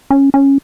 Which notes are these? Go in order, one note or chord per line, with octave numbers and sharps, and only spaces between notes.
C#4
C#4